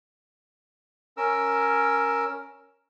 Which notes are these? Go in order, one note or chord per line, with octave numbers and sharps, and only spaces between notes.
C#4 A#4 E6